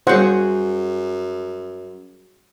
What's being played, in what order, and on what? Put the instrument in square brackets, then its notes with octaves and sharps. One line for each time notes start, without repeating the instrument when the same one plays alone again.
[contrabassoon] F#2 [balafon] G3 A#4 C#5 [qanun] F#4 G#4 [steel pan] C5 F#5